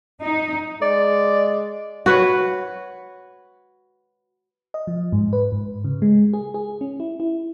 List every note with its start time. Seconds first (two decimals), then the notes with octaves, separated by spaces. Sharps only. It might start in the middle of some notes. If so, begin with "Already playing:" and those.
0.22 D#4
0.82 G#3 D5
2.06 F#4 B4 C#5
4.74 D#5
4.87 F3
5.12 G#2
5.33 B4
5.52 G#2
5.85 C#3
6.02 G#3
6.33 G#4
6.54 G#4
6.81 C#4
7.00 E4
7.20 E4